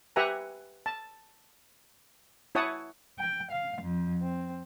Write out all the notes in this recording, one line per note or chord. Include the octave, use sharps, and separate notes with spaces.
G4 B4 E5 F#5 G#5 A#5
A5
E4 C#5 F#5 A5 D#6
G5
F5
F2
C4